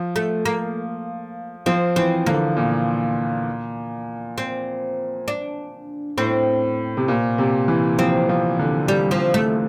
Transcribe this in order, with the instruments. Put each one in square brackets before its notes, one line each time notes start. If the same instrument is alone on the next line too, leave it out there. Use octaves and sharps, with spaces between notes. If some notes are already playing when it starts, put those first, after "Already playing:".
Already playing: [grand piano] F3
[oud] A3
A#3
[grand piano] F3 [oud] C4
[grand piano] E3 [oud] C4
[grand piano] D3 [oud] A#3
[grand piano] A#2
[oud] C4
D4
[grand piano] A2 [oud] C4
[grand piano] C3
A#2
C3
E3
[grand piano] F3 [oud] C4
[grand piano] F3
D3
[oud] G3
F3
A3